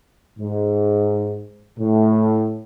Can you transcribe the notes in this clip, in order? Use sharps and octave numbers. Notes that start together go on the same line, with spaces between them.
G#2
A2